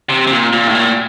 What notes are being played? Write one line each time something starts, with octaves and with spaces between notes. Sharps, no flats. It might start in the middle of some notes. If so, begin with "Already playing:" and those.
C3
C3
A#2
A#2
A2
A#2